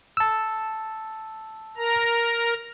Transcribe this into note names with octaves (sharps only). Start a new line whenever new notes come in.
A5 E6
A#4 A#5